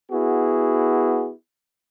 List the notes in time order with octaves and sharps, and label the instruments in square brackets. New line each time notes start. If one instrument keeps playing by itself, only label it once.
[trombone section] B3 E4 F#4 G#4